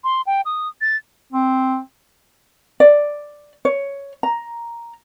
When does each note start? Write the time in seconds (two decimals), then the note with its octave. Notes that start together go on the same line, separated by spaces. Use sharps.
0.04 C6
0.27 G5
0.45 D#6
0.81 A6
1.33 C4
2.80 D5
3.65 C#5
4.23 A#5